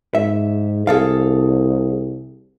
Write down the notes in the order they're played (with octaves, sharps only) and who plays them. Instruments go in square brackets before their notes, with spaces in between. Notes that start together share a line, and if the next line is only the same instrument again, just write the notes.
[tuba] G#2 [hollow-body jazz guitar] E5
[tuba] C2 [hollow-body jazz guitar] G#4 A4 F5